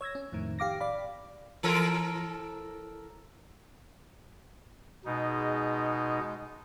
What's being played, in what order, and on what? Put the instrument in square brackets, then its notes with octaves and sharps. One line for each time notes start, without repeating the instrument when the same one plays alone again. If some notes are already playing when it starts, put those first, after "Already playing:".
[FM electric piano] C#5 E6 G#6 A#6
C#4
F2 A2 D#3
G4 F5 D6 A#6
D5 F5 B5
[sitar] E3 A4 A#4
[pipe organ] B2 D#4 [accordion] G#3